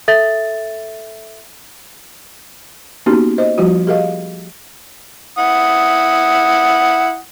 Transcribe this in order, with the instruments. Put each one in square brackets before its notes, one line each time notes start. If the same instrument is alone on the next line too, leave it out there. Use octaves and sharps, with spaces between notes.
[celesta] A4 E5 A6
[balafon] A#3 B3 C#4 D#4 F#4 G4
C5 D#5
F3 G3 F4 F#4
G4 G#4 A#4 D#5 F5
[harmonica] E4 F#5 D#6